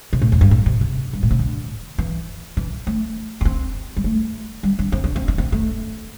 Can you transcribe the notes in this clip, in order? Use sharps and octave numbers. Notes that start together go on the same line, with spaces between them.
C3
A2
E2
G2
A2
C3
C3
G2
A2
C3
D3
E3
E3
A3
D4
C4
G3
A3
G3
D4
C4
D4
C4
D4
C4
A3